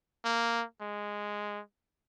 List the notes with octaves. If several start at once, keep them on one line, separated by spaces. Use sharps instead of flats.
A#3
G#3